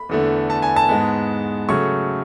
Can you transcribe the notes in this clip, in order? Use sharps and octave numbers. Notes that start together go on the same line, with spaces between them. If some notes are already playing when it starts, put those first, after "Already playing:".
Already playing: B5
E2 D3 A3
A5
G#5
A5
G#2 G#3 B3
C#3 F#3 A3 C#6